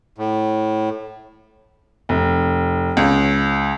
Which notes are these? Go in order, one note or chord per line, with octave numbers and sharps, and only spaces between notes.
A2
F1
C#2